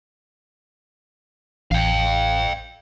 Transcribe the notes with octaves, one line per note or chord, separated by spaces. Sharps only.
A1 F5 G5